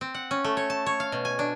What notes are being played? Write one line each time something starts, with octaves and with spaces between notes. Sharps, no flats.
C4
F#5
C#4
A3
C#5
A5
C#5
F5
B2
G#5
D4